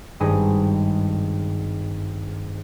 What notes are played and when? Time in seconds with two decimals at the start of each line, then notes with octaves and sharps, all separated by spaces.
0.20 G#1 G2 D#4 G#4